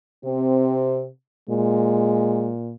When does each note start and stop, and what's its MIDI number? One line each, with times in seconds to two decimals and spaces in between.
0.25 1.09 48
0.25 1.06 60
1.50 2.74 46
1.50 2.51 56